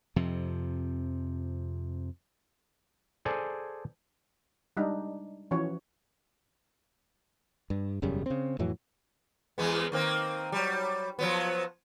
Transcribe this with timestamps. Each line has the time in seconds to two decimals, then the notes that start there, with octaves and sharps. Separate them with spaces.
0.16 F2 C3 F3
3.25 G#4 A4 C5 D5 G#5
4.77 G3 G#3 D4 D#4
5.51 E3 F3 C#4 F#4 C#5
7.70 G2
8.02 E1 F#2 C#3 G3
8.26 C#3 C4
8.59 F2 A2 E3 F#3
9.58 E2 G#3 B3
9.92 D#3 A#3 C4
10.52 F#3 G3
11.19 F3 F#3 B3